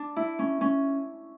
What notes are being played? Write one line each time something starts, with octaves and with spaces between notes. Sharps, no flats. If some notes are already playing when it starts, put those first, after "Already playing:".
Already playing: D4
E4
C#4
C#4